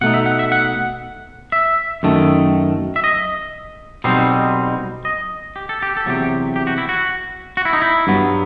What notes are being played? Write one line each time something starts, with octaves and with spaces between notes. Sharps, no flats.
B2 A3 D#4 F#5
E5
F#5
E5
F#5
E5
F#2 D#3 A3
E5
D#5
B1 B2 G3 C4 D#4 C5
D#5
G4
A4
G4
A4
E2 C3 F#3 G4
G4
F#4
E4
F#4
F#4
E4
D#4
E4
G2 F#3 B3